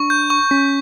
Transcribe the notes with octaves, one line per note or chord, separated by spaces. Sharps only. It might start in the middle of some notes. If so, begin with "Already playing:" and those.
Already playing: D4 C#6
G6
C#6
C#4 B6